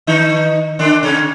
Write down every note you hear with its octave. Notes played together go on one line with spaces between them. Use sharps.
D#3 D#4
D3 D4
C#3 C#4